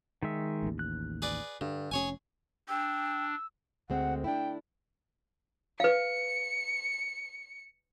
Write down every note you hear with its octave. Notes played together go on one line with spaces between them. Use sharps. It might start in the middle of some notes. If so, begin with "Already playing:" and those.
D#3 G#3 E5
A1 D#2
F#6
G#4 B4 D5
G2 D3
F1 C#4 G#4 C#5 G#5
D4 G5 E6
D2 G#3 C4 F#5
D4 E4 G5
B4 F5 C#7